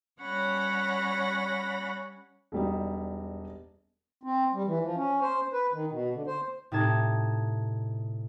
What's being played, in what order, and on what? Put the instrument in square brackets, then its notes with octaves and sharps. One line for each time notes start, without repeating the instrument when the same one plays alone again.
[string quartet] G3 C#4 C#5 F#5 B5 A#6
[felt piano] E1 G3 D#4
[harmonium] C4
G3
E3
F3
C#4
C5
B4
D#3
B2
D3
C5
[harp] A2 C3 D#4 A5 G#6